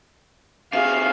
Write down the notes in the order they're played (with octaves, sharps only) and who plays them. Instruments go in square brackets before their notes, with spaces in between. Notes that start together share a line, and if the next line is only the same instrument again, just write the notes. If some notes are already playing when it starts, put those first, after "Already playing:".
[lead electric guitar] C3 G#4 [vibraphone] E5 [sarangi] F5